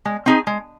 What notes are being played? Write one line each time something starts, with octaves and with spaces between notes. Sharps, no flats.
G#3
C4 D#4 G#4
G#3